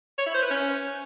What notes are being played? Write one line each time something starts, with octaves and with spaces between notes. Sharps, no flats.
C#5
E4
C5
B4
C#4